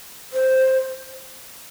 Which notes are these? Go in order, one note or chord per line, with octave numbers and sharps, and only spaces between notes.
C5